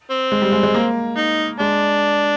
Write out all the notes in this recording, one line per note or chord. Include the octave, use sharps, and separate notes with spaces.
C4
G#3
G3
G#3
G#3
A#3
D#4
G#3 D4